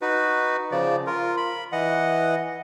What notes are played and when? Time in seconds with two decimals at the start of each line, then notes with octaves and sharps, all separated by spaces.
0.02 D#4 F#4 B4
0.72 C#3 F3 D5
1.07 F4 A#4
1.37 B5
1.72 E3 D#5 F#5